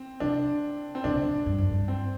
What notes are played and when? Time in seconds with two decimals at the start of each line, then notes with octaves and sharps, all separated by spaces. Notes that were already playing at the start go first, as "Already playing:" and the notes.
Already playing: C4
0.20 C3 D4
0.95 C4
1.04 B2 D4
1.14 C3
1.23 B2
1.46 G2
1.58 F#2
1.71 G2
1.88 C4